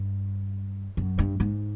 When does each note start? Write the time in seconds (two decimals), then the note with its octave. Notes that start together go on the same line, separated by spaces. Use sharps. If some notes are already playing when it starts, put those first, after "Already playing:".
Already playing: G2
0.97 F#2
1.19 G2
1.40 G#2